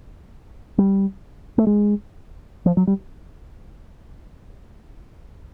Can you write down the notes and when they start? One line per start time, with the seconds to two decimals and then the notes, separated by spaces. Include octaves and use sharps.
0.78 G3
1.58 A3
1.67 G#3
2.66 F3
2.77 F#3
2.87 G3